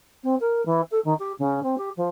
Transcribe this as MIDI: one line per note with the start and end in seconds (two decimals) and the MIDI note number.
0.23 0.35 60
0.40 0.64 70
0.65 0.81 52
0.91 0.99 69
1.04 1.14 51
1.19 1.32 67
1.39 1.60 49
1.63 1.75 60
1.78 1.90 67
1.97 2.09 53